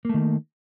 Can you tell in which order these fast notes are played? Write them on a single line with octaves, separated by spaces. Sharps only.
A#3 A3 D#3